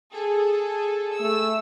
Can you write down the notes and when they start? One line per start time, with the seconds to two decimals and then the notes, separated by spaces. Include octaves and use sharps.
0.13 G#4 A4
1.20 A3 E6